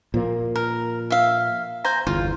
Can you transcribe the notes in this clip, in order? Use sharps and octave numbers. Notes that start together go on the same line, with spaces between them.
A#2 F3 A#3
A#4
E5 F5
C5 G#5 A#5
G1 E2 F4